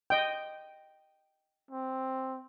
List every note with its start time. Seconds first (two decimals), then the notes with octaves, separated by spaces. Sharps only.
0.10 D#5 G5
1.71 C4